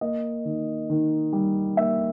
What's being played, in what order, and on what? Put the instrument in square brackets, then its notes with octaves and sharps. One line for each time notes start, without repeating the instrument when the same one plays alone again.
[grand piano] A#3 D#5
D#3
D#3
G3
A#3 E5